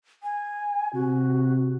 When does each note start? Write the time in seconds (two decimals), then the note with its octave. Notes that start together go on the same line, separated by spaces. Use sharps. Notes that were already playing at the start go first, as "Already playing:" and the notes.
0.23 G#5
0.94 C3 F#4